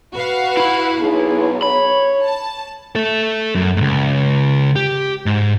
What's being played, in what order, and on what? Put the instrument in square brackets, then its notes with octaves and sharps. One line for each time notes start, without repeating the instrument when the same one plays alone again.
[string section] F#4 B4 F5
[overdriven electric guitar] E4 B5
[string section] B1 B3 [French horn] G#4
[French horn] C#5 [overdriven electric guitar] B5
[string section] A5
[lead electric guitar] A4 E5
F#2
C#2 G#2
G4
G#2